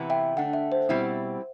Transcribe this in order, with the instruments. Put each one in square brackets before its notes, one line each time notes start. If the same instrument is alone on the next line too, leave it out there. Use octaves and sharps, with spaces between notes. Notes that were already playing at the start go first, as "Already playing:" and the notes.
Already playing: [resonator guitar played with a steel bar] C3 E3 B3 E4
[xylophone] E5 G5
[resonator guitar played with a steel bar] D3 A3 D4 [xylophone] F#5
[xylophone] E5
C5
[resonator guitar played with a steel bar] B2 G3 C4 E4